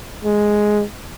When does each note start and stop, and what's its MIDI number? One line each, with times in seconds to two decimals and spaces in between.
0.24 0.83 56